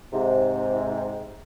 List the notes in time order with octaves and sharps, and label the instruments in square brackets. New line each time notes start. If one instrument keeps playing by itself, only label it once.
[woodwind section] G#2 C3